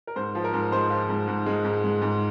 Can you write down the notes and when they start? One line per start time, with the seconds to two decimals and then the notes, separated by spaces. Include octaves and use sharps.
0.07 A#4
0.16 G#2 C5
0.35 F3
0.44 A#4
0.53 G#2
0.72 G#3 C5
0.90 F3
1.09 G#2
1.28 G#2
1.46 G#3
1.64 G#2
1.84 G#3
2.02 G#2